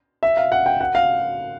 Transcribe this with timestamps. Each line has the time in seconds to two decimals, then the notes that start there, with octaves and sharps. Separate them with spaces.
0.23 E5
0.37 F5
0.52 F#5
0.66 G5
0.81 F#5
0.95 F5